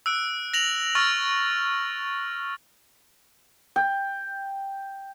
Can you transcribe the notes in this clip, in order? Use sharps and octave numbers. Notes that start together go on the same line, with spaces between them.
E6 F#6 D7
A#6 F7 F#7
C#6 F6 A6
G5